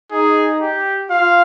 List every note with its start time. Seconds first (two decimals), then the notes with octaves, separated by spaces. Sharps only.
0.11 D#4 G#4
0.61 G4
1.10 F4 F5